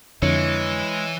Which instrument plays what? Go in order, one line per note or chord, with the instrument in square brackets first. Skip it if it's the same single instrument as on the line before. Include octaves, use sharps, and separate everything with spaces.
[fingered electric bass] F2 D3 [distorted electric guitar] E3 [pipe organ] G#3 [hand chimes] E4 C#5 C#7